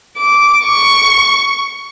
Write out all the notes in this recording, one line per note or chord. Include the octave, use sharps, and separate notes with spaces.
D6
C#6